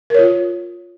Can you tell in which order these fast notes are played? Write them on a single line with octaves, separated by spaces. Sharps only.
A#4 C#5 F4